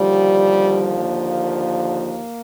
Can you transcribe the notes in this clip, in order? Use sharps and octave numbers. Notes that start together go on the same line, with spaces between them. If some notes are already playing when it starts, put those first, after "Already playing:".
Already playing: D#2 D3 F3 G3
A#3